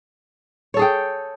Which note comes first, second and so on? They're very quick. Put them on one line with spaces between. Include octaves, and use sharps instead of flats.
C#5 A4 G#4 G5